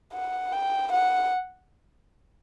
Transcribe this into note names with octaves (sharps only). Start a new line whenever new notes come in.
F#5
G5
F#5